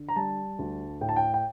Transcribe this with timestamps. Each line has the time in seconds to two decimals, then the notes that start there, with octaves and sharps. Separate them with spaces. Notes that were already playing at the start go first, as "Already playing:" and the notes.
Already playing: D3
0.09 A#5
0.16 G3 A5
0.59 D2
1.01 A2 G5
1.09 A5
1.16 G5
1.34 G5